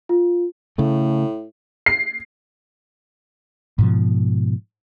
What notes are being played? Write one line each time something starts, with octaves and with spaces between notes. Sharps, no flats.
F4
A2 C#3 A3
C7
G#2 B2 F3